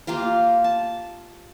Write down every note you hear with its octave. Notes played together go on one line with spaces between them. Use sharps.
A#3 F4 G4 F5
A5